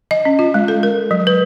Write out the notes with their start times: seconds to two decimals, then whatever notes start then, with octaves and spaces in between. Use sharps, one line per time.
0.11 D#5
0.25 C#4
0.39 F4
0.54 G#3
0.68 A4
0.83 A#4
1.11 F#3
1.27 B4